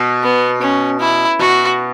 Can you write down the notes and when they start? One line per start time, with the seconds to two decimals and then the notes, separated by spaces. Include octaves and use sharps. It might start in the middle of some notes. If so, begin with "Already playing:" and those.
Already playing: B2
0.23 B3
0.62 C#4
1.00 E4
1.39 B2 F#4